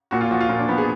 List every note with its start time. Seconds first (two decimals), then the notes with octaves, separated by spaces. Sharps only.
0.11 A#2 F#4
0.21 F4
0.31 F3 F#4
0.41 F4
0.49 A#2
0.59 D4
0.68 F3 B3
0.78 G#4